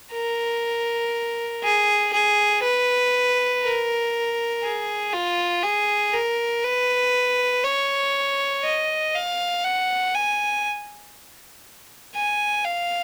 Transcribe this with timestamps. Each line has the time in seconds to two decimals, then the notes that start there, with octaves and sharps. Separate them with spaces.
0.12 A#4
1.63 G#4
2.13 G#4
2.63 B4
3.63 A#4
4.63 G#4
5.13 F4
5.64 G#4
6.13 A#4
6.64 B4
7.64 C#5
8.64 D#5
9.15 F5
9.65 F#5
10.15 G#5
12.15 G#5
12.65 F5